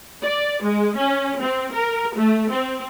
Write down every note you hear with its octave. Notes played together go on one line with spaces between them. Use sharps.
D5
G#3
C#4
C4
A#4
A3
C4